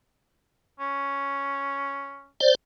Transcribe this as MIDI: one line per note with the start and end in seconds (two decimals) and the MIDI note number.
0.80 2.29 61
2.40 2.55 72
2.40 2.55 74